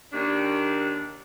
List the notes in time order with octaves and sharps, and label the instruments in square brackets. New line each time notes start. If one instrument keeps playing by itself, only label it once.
[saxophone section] D#2 D4